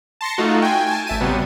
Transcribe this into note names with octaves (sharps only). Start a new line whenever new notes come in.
A5 C6 A#6 C#7
A3 D#4 F4 F#4
G5 G#5
G#5 A5
A1 E5 A5 D#7
C3 F#3 G3 B3